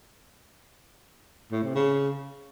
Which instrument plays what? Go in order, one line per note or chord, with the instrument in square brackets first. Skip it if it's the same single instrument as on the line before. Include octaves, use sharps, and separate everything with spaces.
[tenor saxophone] A2
C3
C#3